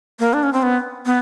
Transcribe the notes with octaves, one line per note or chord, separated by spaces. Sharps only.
A#3
D4
C#4
C4
B3
B3